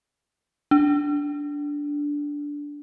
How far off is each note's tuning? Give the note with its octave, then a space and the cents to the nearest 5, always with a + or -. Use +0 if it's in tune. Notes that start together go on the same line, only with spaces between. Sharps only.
D4 -10